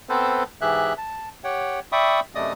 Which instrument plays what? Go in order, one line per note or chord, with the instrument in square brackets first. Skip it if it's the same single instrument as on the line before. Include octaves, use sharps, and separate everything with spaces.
[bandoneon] B3 C4 A4 B4 C5
G#2 E3 G4 G#4 E5 F#6
A5
G4 C#5 F#5 G5
D5 E5 G5 B5 C#6 D#6
F#2 C3 A3 D5 D#5 D#6